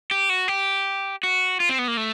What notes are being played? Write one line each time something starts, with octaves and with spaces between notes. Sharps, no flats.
G4
F#4
G4
F#4
F4
C4
B3
A#3
A3